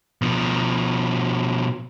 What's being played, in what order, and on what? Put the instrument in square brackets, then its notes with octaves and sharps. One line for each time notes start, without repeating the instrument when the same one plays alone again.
[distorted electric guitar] B2 F3